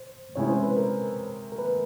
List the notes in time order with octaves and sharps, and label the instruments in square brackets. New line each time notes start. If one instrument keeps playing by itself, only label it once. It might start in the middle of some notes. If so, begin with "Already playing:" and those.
Already playing: [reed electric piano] C5
[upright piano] C3 E3 G#3 C#4 E4 [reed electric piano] C#5
[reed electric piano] C5
B4
A#4
A#4
B4